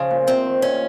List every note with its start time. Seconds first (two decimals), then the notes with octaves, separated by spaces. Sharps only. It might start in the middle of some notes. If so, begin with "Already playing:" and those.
Already playing: C#3 F3
0.11 A#2
0.28 C3 C4
0.45 D#3
0.62 A#2 C#4